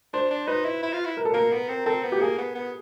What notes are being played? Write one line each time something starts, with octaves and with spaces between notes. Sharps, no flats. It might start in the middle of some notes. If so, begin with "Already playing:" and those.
D4 C5
D4
D#4 B4
E4
E4
F4
E4
A#4
A4
A#3 A#4
B3
C4
C4 A4
B3
G4
A#3 G#4
B3
B3